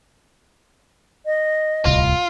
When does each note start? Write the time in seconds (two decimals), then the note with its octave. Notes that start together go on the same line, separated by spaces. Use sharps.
1.26 D#5
1.85 D1 C2 F4